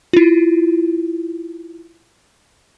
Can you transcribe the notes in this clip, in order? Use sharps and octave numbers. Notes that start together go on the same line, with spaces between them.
E4 F4